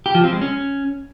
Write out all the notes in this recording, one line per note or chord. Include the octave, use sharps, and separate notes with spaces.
G4
F3
C4
G#3
C#4